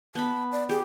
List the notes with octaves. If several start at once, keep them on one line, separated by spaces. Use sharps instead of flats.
B3 A5 B5
D5
G4 G#4